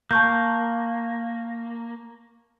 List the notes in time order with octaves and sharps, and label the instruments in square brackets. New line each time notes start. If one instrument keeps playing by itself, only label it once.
[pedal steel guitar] A#3 [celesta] A5 C#6 G6